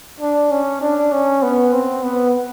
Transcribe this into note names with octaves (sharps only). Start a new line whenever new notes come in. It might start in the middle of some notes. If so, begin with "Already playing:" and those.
D4
C#4
D4
C#4
B3
C4
B3